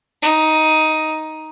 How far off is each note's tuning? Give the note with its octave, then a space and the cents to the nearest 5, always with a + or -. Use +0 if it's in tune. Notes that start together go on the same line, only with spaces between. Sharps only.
D#4 +10